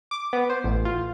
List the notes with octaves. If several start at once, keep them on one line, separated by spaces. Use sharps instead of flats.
D6
B3
C5
A1
F4